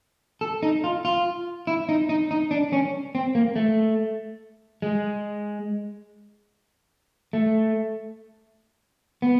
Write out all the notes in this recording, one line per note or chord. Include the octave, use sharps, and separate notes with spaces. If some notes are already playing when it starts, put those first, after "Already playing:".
A4
D#4
F4
F4
E4
D#4
D#4
D#4
D4
C#4
C4
A#3
A3
G#3
A3
B3